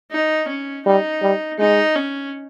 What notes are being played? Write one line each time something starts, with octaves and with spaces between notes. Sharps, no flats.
D#4
C#4
G3 D#4
G3
G#3 D#4
C#4